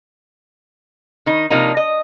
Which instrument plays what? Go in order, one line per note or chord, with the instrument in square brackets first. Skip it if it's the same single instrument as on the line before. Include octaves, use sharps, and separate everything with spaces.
[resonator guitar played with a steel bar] D#3 D#4
C3 F3 A#3 D4 D#4
D#5